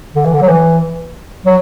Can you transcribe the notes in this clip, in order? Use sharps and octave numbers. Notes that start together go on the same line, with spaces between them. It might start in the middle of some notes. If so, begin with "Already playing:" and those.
D3
E3
D3
F#3
E3
F#3